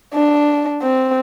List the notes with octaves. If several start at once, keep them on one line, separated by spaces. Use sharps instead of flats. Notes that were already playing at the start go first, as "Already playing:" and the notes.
D4
C4